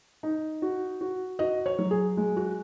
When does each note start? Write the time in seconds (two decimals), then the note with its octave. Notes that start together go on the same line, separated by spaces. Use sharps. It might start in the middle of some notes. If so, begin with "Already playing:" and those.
0.23 D#4
0.62 F#4
1.01 F#4
1.39 F#4 D#5
1.66 C#5
1.79 F#3
1.91 G#4
2.17 G#3
2.37 F#4